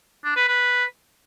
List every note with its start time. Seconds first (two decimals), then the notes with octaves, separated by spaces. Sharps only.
0.24 D4
0.36 B4
0.48 B4